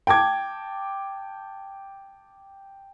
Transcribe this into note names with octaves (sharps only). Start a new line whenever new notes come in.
G5 A5 D6 G#6